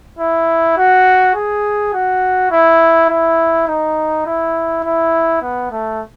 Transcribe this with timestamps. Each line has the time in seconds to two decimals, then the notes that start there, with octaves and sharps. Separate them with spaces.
0.19 E4
0.77 F#4
1.35 G#4
1.93 F#4
2.51 E4
3.10 E4
3.68 D#4
4.27 E4
4.85 E4
5.42 B3
5.71 A3